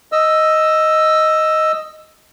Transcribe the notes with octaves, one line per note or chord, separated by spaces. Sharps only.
D#5 E6